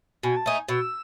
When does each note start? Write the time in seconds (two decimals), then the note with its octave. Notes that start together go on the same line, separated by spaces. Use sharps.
0.23 B2 G#5
0.37 A5
0.46 A3 D#4 G#5
0.69 B2 E6